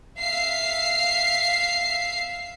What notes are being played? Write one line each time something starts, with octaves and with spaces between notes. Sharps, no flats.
E5 F5 C7